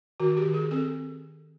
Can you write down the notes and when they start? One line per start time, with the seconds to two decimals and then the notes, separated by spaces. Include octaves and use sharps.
0.20 D#3 F#4
0.37 G4
0.45 D#3
0.54 G#4
0.71 C4 A4